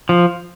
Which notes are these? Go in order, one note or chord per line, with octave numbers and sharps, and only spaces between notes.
F3